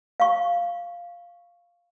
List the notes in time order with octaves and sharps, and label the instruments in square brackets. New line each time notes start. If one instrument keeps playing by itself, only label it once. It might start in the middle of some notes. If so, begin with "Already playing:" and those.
[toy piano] F5 C#6